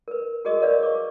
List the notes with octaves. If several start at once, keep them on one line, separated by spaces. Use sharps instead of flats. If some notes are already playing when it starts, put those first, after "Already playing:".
A#4 B4
F#4 G#4 A#4 D#5 C#6 D#6
A#4 B4 C#5 D5 F5 D#6
C#6 D6